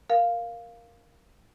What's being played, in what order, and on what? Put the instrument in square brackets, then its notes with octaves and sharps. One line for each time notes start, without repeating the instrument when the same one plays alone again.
[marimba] A#4 F5